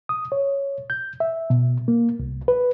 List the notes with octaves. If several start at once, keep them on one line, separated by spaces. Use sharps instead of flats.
D#6
C#5
G6
E5
B2
A#3
C2
B4